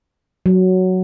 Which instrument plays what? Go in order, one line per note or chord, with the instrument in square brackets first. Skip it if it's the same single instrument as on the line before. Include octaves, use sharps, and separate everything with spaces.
[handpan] F#3